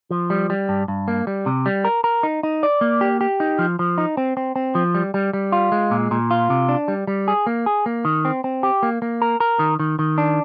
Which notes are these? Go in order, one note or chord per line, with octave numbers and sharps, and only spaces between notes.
F3
G3
G3
G2
G2
A#3
G3
C3
G3
A#4
A#4
D#4
D#4
D5
A#3
G4
G4
D#4
F3
F3
D#4
C4
C4
C4
F3
G3
G3
G3
F4
G#3
A#2
A#2
F4
C3
D4
G3
G3
G#4
A#3
G#4
A#3
D#3
C4
C4
G4
A#3
A#3
A#4
A#4
D#3
D#3
D#3
D4